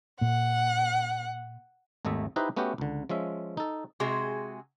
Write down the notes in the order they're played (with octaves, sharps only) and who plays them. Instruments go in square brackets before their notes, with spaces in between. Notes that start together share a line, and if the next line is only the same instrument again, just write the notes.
[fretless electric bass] A#2 [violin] F#5
[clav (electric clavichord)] G#1 D#2 A3 D#5 E5
D#4 E4 G4 B4 C5 D#5
A3 B3 C#4 F#4 G4
C#2 D3
F3 G#3 C#4 E5
D#4 A4
[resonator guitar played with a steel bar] C3 G#3 F#4 G#4